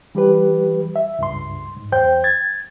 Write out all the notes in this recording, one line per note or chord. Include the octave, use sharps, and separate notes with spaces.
E3 G3 G4 B4
E5
C#2 G2 C6
G#2
E2 C5 G5 G6
G#6 A6